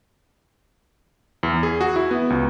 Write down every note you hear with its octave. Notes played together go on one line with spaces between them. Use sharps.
E2
G#4
F#4
E4
B3
C#2